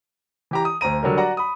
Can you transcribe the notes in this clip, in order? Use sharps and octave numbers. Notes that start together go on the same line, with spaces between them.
E3 G4 A#5
D#6
D2 C5 A#5 D#7
D3 F#3 G3 A#4
F#4 D5 F#5 A#5
B5 D#6